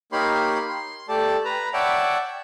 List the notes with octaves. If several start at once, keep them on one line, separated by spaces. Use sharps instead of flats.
A#3 D#4 G4 C#5 B5 C6
C6
A3 G4 A4 D5 A5
B4 A#5
C#5 D5 E5 F#5 G5 A5